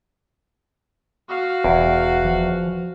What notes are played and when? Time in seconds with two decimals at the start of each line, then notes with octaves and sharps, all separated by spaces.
1.28 F#4 F5
1.64 E1 E2
2.25 F3